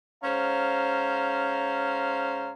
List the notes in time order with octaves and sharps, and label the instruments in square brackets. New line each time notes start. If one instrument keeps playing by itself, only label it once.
[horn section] G#2 C#4 C5 F5 A#5